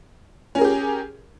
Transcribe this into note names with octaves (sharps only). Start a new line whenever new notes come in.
C#4 G4 G#4 A#4